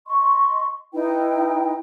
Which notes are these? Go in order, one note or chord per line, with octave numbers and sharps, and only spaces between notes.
D#5 C6 C#6
D#4 E4 B4 G5